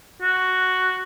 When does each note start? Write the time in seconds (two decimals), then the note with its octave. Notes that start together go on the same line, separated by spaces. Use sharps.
0.22 F#4